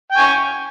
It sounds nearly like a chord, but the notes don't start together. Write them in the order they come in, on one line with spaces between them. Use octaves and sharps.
G5 G#5 C#6